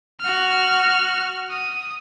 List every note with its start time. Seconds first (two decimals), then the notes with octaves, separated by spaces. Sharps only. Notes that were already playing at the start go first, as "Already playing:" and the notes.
0.21 F#4 F6
1.51 D#6